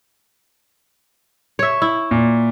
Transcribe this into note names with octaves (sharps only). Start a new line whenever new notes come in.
C#5 E5
E4
A#2